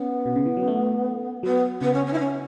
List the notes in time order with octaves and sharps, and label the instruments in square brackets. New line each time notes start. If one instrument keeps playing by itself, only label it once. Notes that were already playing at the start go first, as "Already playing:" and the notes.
Already playing: [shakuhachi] B3 [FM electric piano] C#4
[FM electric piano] B2
C#3
E3
F#3
A3
[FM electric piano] F#3 [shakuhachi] B3
[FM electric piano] C#3 [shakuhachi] B3
[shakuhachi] C#4
C#4
E4
C#4